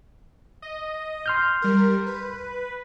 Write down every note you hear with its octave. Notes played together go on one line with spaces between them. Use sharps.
D#5
C6 F6 G6
G3 A#4
B4